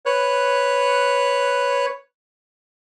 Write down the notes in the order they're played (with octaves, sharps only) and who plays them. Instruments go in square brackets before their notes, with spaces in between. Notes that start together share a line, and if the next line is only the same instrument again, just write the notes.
[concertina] B4 C#5 F#6